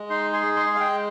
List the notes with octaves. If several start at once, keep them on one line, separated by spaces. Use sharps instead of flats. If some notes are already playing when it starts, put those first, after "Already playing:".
Already playing: G#3
D#4 C6
G#4 C6
G#3 C6
F5
G#3 G5